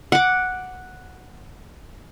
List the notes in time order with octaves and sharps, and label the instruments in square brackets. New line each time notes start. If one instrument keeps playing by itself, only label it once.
[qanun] F#5 D6